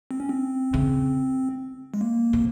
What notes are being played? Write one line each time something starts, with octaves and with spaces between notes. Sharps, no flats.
C4
C#4
C4
C#3
G#3
A#3
C3